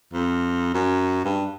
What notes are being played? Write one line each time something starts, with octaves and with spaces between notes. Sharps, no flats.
F2
F#2
G2